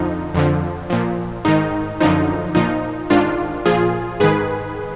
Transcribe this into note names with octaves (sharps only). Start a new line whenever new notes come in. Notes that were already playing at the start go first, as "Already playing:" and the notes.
Already playing: F2 D3 F3 D#4
F2 D3 F3
A#2 F3
G#2 D#3 D#4
F#2 D3 F3 D#4
A#2 F3 D#4
G#2 D#3 D4 F4
A#2 F3 F4 G#4
G#2 D#3 G#4 B4